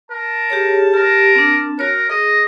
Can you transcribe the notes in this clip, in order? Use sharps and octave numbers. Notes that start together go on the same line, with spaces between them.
A#4 A5
G4 G#4 C#5
G4 A#4
C4 D4
F#4 A#4 C#5
G#4 D#5